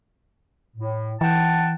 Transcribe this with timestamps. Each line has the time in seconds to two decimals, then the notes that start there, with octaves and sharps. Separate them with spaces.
0.77 A2
1.21 E3 F#5 G5 A5